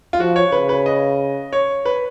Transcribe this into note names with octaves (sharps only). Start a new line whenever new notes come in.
F4
F3 F#4
C#5
C#3 B4
B4
D#5
C#5
B4